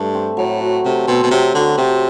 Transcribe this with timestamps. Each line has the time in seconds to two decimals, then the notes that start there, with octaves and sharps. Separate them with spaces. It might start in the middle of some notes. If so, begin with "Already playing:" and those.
Already playing: G2 A3
0.14 C4
0.37 A2 F#3
0.60 F#4
0.85 C3 A3
1.07 B2 C4
1.23 B2
1.31 C3 F#3
1.54 D3 F#4
1.77 C3 C4